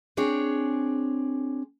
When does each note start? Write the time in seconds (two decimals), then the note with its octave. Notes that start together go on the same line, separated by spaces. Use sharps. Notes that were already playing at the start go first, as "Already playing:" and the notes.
0.17 C4 D4 G#4 C#5